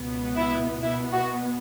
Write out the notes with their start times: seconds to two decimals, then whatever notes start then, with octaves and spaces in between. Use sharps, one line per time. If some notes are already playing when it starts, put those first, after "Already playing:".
Already playing: C#2 B2 B3
0.36 E4
0.82 B2 B3 E4
1.13 F#4